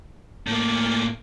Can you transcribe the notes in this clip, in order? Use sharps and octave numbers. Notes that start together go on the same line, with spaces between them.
A2 A#3